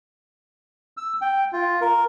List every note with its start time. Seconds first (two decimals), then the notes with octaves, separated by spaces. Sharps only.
0.97 E6
1.21 G5
1.53 F4
1.81 A#4